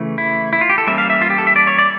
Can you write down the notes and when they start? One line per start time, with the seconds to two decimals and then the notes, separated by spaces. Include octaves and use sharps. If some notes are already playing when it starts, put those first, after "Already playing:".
Already playing: C#3 E3 A3
0.18 E4
0.53 E4
0.61 F4
0.69 G4
0.78 A4
0.87 E3 G3 A#3 C#4 E5
0.98 F5
1.10 E5
1.21 F4
1.30 G4
1.38 A4
1.47 E5
1.56 D5
1.67 C#5
1.79 D5